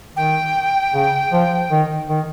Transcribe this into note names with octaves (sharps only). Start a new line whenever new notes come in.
D#3 G5
C#3
F3
D#3
D#3